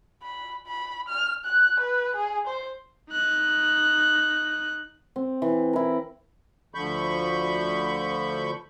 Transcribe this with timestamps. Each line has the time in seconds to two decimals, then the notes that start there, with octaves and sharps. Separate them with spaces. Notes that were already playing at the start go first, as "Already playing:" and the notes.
0.23 B5
0.67 B5
1.09 F6
1.45 F#6
1.80 B4
2.16 G#4
2.47 C5
3.11 D#4 F#6
5.16 C4
5.42 E3
5.73 E4 A#4
6.75 D2 D3 F3 B5 C#6 G6